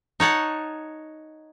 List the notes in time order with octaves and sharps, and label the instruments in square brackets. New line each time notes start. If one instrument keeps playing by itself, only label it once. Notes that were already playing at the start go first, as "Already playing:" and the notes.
[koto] D#4 C#5 F#5 A5